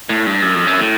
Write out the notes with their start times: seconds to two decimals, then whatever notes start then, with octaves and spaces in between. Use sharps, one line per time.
0.09 A2
0.26 G2
0.42 F#2
0.54 F2
0.67 F#2
0.79 A2